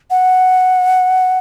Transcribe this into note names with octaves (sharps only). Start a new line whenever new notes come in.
F#5